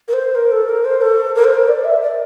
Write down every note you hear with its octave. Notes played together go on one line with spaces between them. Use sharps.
A#4
C5
A#4
A4
A#4
C5
A4
A#4
C5
A#4
D5
E5
D5